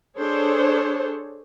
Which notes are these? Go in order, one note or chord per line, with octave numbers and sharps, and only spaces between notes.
D4 G#4 A4 C5 C#5